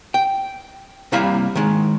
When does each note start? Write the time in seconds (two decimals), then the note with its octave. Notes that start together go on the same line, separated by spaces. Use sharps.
0.14 G5
1.12 C3 G3 A#3 E4 F5 B5
1.55 D#3 G#3